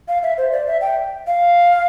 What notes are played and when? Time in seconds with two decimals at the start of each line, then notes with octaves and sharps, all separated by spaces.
0.08 F5
0.23 E5
0.38 C5
0.52 D5
0.67 E5
0.81 G5
1.27 F5